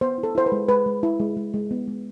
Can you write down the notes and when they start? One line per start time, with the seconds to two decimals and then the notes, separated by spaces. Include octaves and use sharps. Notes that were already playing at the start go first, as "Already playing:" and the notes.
0.01 B3 C5
0.18 E4
0.23 A4
0.35 E4 C5
0.46 B4
0.52 G#3
0.69 G#3 B4
0.86 G#3
1.03 E4
1.20 G#3
1.37 G#3
1.54 G#3
1.71 B3
1.88 G#3